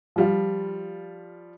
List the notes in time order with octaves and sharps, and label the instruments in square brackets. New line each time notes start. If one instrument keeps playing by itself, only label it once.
[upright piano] F3 G3 F4